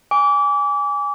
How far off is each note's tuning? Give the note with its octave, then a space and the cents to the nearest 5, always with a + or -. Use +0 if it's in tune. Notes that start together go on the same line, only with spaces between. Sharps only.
G#5 -20 D6 -30